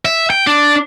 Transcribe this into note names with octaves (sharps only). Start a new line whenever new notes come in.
E5
G5
D4